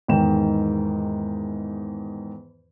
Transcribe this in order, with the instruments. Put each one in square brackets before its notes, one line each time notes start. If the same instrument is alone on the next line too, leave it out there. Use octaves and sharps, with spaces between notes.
[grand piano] E2 G#2 D#3 G5 E7